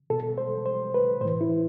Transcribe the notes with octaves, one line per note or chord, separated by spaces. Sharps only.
B2 A4
C5
C5
B4
A2 E3 C5
E4